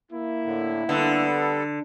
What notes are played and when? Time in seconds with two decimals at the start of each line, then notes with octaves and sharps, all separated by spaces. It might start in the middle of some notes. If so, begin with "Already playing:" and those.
0.11 A#3 E4
0.45 A2 D3
0.89 D3 G3 B3 A4